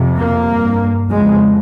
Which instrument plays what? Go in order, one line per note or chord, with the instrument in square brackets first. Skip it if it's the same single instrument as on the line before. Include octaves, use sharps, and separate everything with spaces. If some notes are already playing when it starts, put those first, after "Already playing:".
Already playing: [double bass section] F2 C3
A#3
G2
F2 C#3 G#3